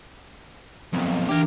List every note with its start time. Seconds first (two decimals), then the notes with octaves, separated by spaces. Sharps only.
0.93 B1 F2
1.29 E3 D4 G4 A#4